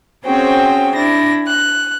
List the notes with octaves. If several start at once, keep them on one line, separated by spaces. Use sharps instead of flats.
C4 C#4 F#4 G#4 C5 G5
D4 E4 A#6
F#6